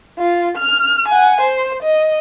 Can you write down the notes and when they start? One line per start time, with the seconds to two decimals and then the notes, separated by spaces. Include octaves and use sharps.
0.19 F4
0.57 F6
1.08 F#5 G#5
1.41 C5
1.82 D#5